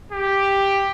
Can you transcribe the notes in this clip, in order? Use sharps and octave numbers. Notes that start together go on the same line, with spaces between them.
G4